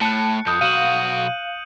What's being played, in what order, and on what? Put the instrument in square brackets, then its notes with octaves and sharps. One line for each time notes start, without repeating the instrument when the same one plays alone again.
[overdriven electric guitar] A2 [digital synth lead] A5 [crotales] F#6 C#7
[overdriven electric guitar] F2 [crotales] D#6 G6
[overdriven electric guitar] B1 F#4 [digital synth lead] F5 [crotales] D#7 F#7